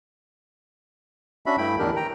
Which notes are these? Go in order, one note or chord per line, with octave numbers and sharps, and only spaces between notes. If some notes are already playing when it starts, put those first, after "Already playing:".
C#4 D4 F#4 E5 B5
G2 A3 E4 G5 B5
E2 A2 D#3 D4 G4 A#4
G5 A#5